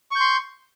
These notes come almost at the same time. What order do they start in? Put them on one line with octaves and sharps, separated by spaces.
C#6 G6 C6